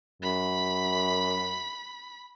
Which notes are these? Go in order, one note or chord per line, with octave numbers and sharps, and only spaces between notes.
F#2 B5